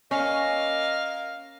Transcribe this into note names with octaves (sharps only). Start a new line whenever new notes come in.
A#3 C#4 D#5 F5